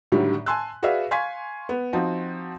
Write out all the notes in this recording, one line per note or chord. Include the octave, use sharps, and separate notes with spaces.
A2 D3 D#3 F#3 G3
G#5 A5 C6 E6 F#6
F#4 G#4 B4 D5 E5 F5
F5 G#5 C6 C#6 G#6 B6
B3
F3 C4 D#4 F#4